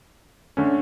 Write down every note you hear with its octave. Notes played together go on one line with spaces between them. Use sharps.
D3 A3 C#4